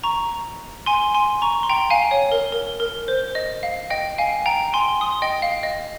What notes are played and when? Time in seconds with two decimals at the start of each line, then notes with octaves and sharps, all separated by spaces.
0.03 A#5 C#6
0.86 G#5 C6
1.15 G#5 C6
1.42 A#5 C#6
1.63 C6
1.69 G5 A#5
1.90 F5 G#5
2.11 C#5
2.32 A#4
2.52 A#4
2.80 A#4
3.08 C5
3.35 D#5
3.63 F5
3.90 D#5 G5
4.18 F5 G#5
4.46 G5 A#5
4.73 G#5 C6
5.01 C6 D#6
5.22 D#5 G5
5.42 F5
5.63 D#5